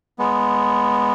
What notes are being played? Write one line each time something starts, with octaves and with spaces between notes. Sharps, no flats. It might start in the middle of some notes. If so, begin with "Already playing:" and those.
G#3 B3